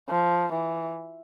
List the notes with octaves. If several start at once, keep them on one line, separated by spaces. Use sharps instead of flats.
F3
E3